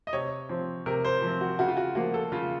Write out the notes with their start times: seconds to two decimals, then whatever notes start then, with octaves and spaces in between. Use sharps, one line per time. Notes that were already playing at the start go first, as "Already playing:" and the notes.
0.07 D#5
0.13 C3 C#5
0.49 F3 C4
0.86 C3 A#4
1.05 C5
1.22 F3 C4
1.41 F#4
1.59 C#3 F#4
1.68 F4
1.77 F#4
1.95 F3 A#3 F#4
2.14 A4
2.32 C#3 F4